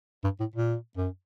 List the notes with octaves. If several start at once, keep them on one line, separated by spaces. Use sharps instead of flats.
G2
A2
A#2
F#2